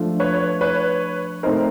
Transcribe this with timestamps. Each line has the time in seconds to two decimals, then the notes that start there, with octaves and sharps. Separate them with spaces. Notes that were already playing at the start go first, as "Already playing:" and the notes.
Already playing: F3 A3 D4 F4
0.20 B4 C#5
0.61 B4 C#5
1.43 A3 C4 D#4 A#4 C5